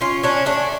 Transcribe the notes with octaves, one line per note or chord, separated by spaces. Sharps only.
C#4 F4
C#4 D4
A3 D4